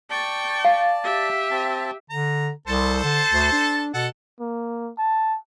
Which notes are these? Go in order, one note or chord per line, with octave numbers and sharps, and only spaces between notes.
D5 G5 A5 C#6
F5
G4 E5
C4 A5
D3 A#5
C2 A4 C5 A5
D3
D2
D4
B2 A4 F#5
A#3
A5